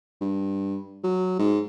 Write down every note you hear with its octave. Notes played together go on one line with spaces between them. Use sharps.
G2
F#3
G#2